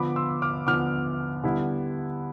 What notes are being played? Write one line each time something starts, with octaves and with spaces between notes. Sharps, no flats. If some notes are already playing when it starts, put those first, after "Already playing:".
Already playing: D3 F3 B3 B5 D6
C6 E6
D6 F6
D3 F3 B3 D6 F6
D3 G3 B3 E4